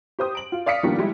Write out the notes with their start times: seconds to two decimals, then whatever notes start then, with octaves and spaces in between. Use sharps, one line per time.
0.19 G4 C5 D#6
0.35 D7 F#7
0.52 F4
0.66 D5 F5 D#6 B6 C#7
0.83 D#3 F3 G3 A#3 B3 D4
0.97 F3 G3 G#3 E4